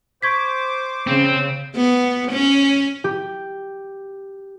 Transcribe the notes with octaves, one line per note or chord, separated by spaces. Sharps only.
C5 C#6 D6 G#6 B6
C#3 C4
B3
C#4
G4